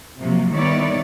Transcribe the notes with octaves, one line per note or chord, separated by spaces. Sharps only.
C3 F3 F#3 A#3
D#3 G3 B3 E4 C#5 D5